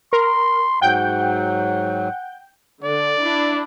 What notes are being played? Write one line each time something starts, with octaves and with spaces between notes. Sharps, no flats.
A#4 C6
G#2 F#3 F#5 G5 G6
D3 D5
D4 E4